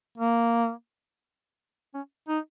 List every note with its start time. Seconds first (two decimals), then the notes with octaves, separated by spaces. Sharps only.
0.18 A#3
1.94 C#4
2.28 D#4